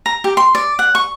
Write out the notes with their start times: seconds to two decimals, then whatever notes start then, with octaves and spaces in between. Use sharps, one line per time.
0.06 A#5
0.24 G4
0.37 C6
0.55 D5
0.79 F#5
0.95 C#6